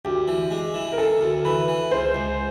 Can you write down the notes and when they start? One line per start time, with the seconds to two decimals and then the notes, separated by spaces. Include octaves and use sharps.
0.05 D2 G4
0.28 E3
0.51 G#3
0.74 E3
0.92 A#4
0.98 C#3 A4
1.21 D2
1.45 E3 B4
1.68 E3
1.91 C#2 C5
2.15 C#2